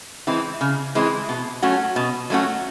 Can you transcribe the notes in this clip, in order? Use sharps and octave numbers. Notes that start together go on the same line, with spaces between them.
E3 G#3 C4 E4
C#3
E3 G#3 C4 E4
B2
F#3 A3 C#4 F#4
B2
F#3 A3 C#4 F#4